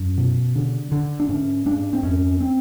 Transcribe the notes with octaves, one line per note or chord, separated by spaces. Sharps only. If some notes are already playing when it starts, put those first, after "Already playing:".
Already playing: F#2 C#4
B2
D3
D3
D4
G#2 C#4
G#2 D4
C4
F2 C#4
C4